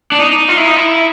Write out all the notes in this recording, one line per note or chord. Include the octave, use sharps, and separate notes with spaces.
D4
D#4
F4
E4
D#4
E4